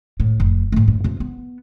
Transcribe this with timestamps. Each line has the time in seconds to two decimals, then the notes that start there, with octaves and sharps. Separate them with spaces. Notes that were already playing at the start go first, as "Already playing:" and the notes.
0.20 A2
0.40 F1
0.72 G#2 A3
0.88 G2
1.04 C3 F4
1.20 B3